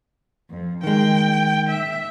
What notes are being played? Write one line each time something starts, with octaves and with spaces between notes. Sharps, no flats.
F2
D#3 G#3 G5
E5